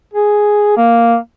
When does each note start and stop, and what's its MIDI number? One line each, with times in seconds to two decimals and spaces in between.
0.13 0.73 68
0.77 1.16 58